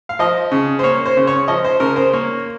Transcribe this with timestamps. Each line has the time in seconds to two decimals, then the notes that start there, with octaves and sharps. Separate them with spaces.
0.09 F5
0.19 F3 D#5
0.52 C#3
0.79 C5
0.83 A#3 C#5
1.06 C5
1.17 C#3
1.27 C#5
1.48 F3 D#5
1.65 C5
1.80 C#3 A#4
1.96 C5
2.13 A#3 C#5